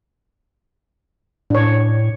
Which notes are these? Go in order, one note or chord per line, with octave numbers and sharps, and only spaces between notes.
A2 D4 C#5